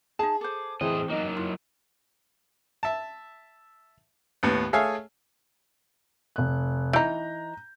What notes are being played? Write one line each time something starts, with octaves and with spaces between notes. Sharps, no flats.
D#4 G#4 A5
A4 C5 D6
A2 E3 C4 G#4 D#5
F#3 A#3 D#4 D#5
E4 F4
E5 A5
D#2 A2 B3
A3 G#4 C#5 E5 F5 G#5
F1 F#6
E3 D#4 A#5 G6